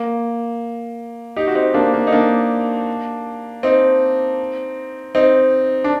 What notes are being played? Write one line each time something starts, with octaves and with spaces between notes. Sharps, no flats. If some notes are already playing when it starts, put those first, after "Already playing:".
Already playing: A#3
D#4 G4
F#4
C4 D#4
A#3 D4
A#3
D#4
A#3 D4
C4 D#4
C4 D#4
D4